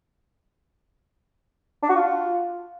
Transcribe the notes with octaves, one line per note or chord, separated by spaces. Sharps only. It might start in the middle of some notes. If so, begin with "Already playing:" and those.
D4
F#4
F4